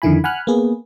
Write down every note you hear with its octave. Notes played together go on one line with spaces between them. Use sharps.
F2 D3 D#3 E4 G#5 B5
F#5 G#5 B5 F6 F#6
A#3 B3 G#4 B4